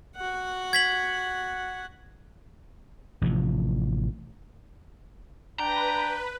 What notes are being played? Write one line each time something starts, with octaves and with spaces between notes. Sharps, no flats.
F#4 F#5
G#6 B6 F#7
A1 C3 D#3 F3
D4 B4 G5 A#5